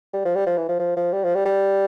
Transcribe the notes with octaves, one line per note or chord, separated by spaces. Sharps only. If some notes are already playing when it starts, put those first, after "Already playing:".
G3
F3
G3
F3
E3
F3
F3
F3
G3
F3
G3
G3